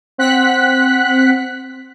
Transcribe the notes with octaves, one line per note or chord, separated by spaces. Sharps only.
C4 F#5 F#6 B6